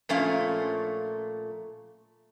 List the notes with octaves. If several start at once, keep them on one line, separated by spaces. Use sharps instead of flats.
A#2 F3 A3 C#4 F5